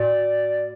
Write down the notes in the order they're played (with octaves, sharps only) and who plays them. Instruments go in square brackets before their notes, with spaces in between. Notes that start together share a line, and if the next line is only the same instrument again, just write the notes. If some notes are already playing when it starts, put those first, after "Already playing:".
Already playing: [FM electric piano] A2 F#4 [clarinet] D5